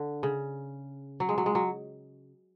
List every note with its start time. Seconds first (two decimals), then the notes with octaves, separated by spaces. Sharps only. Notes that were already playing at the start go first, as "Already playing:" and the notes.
Already playing: D3
0.23 C#3
1.20 F#3
1.29 G#3
1.38 F#3
1.46 G#3
1.55 F#3